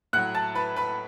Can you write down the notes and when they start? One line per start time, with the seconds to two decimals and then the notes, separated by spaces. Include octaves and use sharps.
0.13 A2 F#3 F#5 F#6
0.35 A5 A6
0.55 B4 B5
0.76 B4 B5